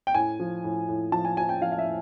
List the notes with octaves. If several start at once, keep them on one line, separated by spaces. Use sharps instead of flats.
G5
A2 G#5
F3
A2
A2
F3 A5
G#5
F3 G#5
G5
F3 F5
F5
E5
A2